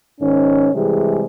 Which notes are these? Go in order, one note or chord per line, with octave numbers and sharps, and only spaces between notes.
G#2 D#3 C#4
C3 E3 G3 G#3 G#4